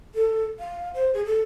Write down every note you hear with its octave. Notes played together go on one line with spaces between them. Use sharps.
A4
F5
C5
G#4
A4